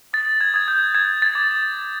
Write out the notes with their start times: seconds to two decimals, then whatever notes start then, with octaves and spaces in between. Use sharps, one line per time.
0.13 D#6 A6
0.41 G#6
0.54 D#6 G#6
0.68 G6
0.94 G6 G#6
1.22 A6
1.35 D6